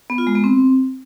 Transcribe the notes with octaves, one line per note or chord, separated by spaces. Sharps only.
B3
F4
G#3
B3
C4